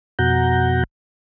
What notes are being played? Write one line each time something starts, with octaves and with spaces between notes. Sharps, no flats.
F2 B2 F#4 F#5 A#5 G6